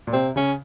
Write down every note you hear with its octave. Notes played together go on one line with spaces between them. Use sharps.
A#2
C3 C4
C#3 C#4